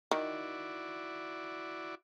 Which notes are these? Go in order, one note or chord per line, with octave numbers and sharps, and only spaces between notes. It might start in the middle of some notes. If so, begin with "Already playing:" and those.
D#3 E4 F#4 D5